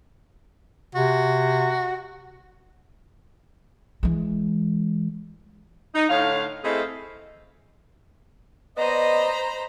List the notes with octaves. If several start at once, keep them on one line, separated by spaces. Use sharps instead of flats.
C3 F#4
E3 G#3
D#4
A2 D3 C#5 F5
A3 C4 E4 G#4 D#5 F5
B3 C5 D5 D#5 A#5 B5